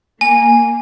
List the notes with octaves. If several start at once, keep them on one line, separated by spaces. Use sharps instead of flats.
A#3 G#5